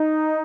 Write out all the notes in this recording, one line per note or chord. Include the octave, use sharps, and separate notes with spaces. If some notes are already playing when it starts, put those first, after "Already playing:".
Already playing: D#4